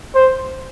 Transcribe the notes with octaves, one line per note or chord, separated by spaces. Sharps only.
C5